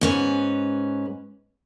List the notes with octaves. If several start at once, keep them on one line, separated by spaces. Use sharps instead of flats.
G#2 C#4 B4